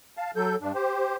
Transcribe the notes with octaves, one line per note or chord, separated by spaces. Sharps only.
F5 A5
F#3 A4 G6
G2 D4
G4 C5